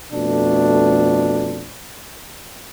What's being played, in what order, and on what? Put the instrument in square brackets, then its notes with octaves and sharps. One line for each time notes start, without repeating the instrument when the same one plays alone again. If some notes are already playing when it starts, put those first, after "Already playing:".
[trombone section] F2 B2 A3 D4